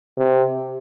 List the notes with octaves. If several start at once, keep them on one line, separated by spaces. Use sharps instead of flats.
C3